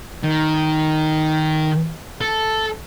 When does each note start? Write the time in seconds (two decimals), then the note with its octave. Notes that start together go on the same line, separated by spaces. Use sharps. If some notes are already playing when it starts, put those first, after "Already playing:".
0.23 D#3
2.21 A4